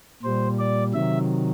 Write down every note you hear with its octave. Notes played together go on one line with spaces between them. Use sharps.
A#2 G3 C5
D5
C3 D#3 F#3 E5